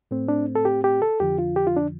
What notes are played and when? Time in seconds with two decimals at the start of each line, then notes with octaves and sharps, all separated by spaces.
0.11 A2 A3 C4
0.28 D4
0.55 A4
0.65 G4
0.84 G4
1.02 A4
1.20 F2 D3 F3 G4
1.38 F4
1.56 G4
1.67 F4
1.76 D4